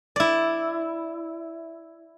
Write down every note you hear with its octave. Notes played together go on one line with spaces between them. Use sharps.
E4 D5